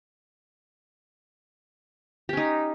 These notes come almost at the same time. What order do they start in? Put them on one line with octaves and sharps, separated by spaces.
G4 C#4 D#4